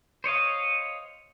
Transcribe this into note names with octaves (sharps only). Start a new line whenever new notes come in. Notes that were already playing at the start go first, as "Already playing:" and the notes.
C5 C#5 D#5 F5